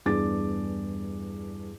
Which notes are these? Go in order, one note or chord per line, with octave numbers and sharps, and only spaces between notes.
E2 G2 D4 G#4 D6 A6